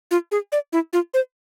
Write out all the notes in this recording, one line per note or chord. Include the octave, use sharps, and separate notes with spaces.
F4
G#4
D5
E4
F4
C5